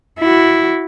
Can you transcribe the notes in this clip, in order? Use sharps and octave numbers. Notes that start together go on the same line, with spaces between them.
E4 F#4